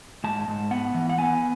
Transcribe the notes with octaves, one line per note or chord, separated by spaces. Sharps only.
G#2 A5
G#2
B3 F#5
E3
F#5
B3 G#5